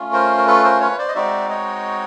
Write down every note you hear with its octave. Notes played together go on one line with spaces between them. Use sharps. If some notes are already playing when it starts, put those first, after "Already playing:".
Already playing: A3 C#4 F4
A#4 C5
A#4
A4 B4
A#4 C5
B4 C#5
C5 D5
D#5
G#3 C4 D#4 F#4 D5 E5
C#5 D#5